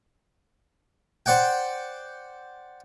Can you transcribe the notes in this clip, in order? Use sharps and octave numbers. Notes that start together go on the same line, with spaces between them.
C5 D5 F#5 G5